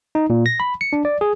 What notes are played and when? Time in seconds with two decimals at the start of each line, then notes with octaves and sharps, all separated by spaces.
0.15 D#4
0.30 A#2
0.46 A#6
0.60 B5
0.81 C#7
0.93 D4
1.05 D5
1.21 G#4